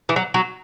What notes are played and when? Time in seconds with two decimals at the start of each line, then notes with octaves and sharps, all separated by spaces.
0.09 E3
0.16 F#3
0.34 F#3